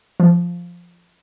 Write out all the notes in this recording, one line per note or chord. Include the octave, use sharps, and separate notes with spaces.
F3